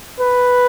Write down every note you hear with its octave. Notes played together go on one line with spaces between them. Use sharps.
B4